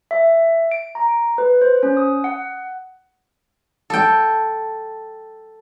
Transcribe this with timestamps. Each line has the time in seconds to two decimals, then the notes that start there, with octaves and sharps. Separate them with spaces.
0.11 E5
0.71 D7
0.95 A#5
1.38 B4
1.61 C5
1.83 C#4
1.97 D#6
2.24 F#5
3.90 A4 G5